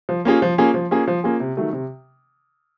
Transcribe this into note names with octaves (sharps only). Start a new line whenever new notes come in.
F3
A#3 C#4 F4 G#4
F3
A#3 C#4 F4 G#4
F3
A#3 C#4 F4 G#4
F3
A#3 C#4 F4 G#4
C3
D#3 F#3 A3
C3